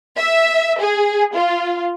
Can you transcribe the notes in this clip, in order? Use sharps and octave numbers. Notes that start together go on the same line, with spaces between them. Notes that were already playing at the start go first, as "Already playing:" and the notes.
E5
G#4
F4